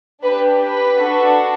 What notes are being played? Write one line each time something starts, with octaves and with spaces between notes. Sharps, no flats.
D4 G4 B4
B4
D4 F#4 A4